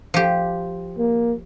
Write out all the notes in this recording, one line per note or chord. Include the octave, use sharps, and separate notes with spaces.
F3 G4
A#3